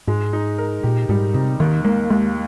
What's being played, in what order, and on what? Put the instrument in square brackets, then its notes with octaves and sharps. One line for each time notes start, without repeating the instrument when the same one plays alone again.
[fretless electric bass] G#2 [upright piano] G#3
[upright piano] D#4
A#4
[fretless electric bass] A#2 [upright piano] G4
[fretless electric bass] G#2 [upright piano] G3
[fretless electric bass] C3 [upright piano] D#4
[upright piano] D#2 [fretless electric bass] D#3
[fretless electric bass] G#3 [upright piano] A#3
[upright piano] D#2 [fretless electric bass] G#3